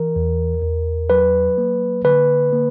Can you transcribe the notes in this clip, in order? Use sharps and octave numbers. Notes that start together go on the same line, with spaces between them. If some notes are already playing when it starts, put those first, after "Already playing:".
Already playing: E3 A#4
E2
E2
F#3 B4
A#3
D3 B4
A#3